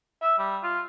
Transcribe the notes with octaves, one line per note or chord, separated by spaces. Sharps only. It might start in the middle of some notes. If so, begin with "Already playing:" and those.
E5
G3
F4